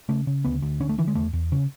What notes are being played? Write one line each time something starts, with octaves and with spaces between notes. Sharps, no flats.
C#3 A3
C#3
D2 B3
D2
D3 C#4
A3
D3 E3
G#3
E2 A3
E2
C#3 C#4